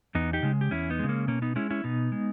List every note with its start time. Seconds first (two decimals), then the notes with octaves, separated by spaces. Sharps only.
0.15 E2 B3 D#4
0.33 D#4 G4
0.43 C#3 G#3
0.61 G4
0.71 E2 C#4 E4
0.90 B3 D#4
0.99 C#3 G#3
1.09 A#3 C#4
1.27 B2 A#3 C#4
1.42 B3 D#4
1.56 G#3 C#4 E4
1.70 C#4 E4
1.84 B2 B3 D#4
2.12 G#3